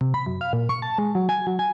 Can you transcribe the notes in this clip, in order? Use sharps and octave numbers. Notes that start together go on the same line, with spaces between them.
C3
B5
F#2
F5
A#2
C#6
A5
G#3
F#3
G#5
F#3
G#5